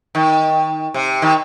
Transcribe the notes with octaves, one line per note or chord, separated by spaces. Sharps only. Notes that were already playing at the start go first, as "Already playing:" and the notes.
D#3
C3
D#3